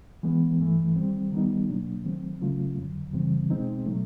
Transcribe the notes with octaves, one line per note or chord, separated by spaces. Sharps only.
E3 G#3 B3
G2 E3 A3
D#3 G3 C4
D#3 G3 B3 D#4
B2 F#3 A#3 D4
D#3 F#3 A3 C4
C#3 F#3 A3 C#4 F4
F2 D3 F#3
F#2 C#3 E3 G3 C4
B2 G#3 C4 D#4
B2 F#3 A3